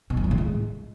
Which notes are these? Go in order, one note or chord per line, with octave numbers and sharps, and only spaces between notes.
B2
F#2
F3
A2
G#3